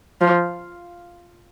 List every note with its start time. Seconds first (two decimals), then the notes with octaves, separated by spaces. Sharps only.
0.21 F3